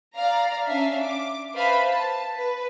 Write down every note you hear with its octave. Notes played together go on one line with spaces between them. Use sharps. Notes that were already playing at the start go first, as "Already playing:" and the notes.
D5 F5 A#5
C#4 D4 E5 F5
D6
B4 C5 E5 F5 A5 B5
A5
B4